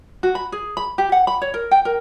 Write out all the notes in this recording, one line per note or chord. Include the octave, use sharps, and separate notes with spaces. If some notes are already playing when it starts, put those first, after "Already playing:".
F#4
B5
G#4
B5
G4
F#5
B5
C#5
A#4
G5
A#4